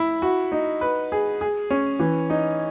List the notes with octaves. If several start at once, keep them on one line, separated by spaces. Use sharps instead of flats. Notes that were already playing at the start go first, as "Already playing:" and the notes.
Already playing: E4
F#4
D#4
B4
G#4
G#4
C#4
E3
D#4